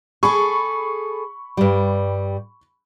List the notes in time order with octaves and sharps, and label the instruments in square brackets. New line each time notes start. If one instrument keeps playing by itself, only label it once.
[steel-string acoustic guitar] G#4 A4 [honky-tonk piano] B5 C#6
[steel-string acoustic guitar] G2 G3